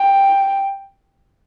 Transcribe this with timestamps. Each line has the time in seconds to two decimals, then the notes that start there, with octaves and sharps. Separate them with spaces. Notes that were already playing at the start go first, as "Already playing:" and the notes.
Already playing: G5